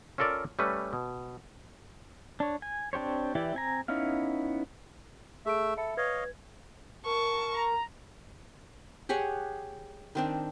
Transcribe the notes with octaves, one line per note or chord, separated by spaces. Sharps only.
C#4 F4 A4 A#4 D5
G3 A3 C#4 B4
B2
D4 C#5
G#5
C4 D4 G4 C5 C#5
E3 E4 G4 D5
C4 G#5 A#5
B3 C#4 D#4 E4 F5
A3 G#4 E5 D7
A4 E5 B5 C#7
B4 C#5 D#5 F5 G#6
A#4 A5 C#6
A#5
G4 G#4 C#5 F#5
D#3 C4 D4